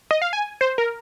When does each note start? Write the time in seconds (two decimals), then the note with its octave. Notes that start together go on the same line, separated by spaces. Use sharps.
0.11 D#5
0.22 F5
0.33 G#5
0.61 C5
0.78 A#4